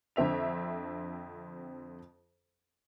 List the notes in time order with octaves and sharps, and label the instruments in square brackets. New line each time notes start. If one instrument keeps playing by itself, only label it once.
[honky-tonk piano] F2 D3 C4 E5 F7